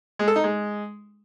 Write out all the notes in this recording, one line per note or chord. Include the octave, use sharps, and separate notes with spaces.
G#3
A4
D#4
G#3